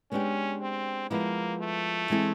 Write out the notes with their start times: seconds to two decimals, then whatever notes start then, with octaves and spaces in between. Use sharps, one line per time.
0.12 G#3 B3 C#4 D4 G4
0.62 C4
1.11 F3 G#3 A#3 B3 E4
1.60 A3
2.10 E3 G#3 C4 E4 A4